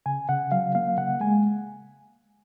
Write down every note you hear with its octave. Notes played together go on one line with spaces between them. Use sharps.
C#3 G#5
C#3 F#5
F#3 F5
A#3 F5
C#3 F#5
G#3 G#5